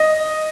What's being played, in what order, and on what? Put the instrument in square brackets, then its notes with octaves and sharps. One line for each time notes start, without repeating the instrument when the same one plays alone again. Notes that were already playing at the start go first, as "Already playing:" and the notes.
Already playing: [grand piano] D#5